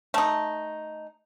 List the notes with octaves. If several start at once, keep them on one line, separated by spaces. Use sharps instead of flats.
A3 D#4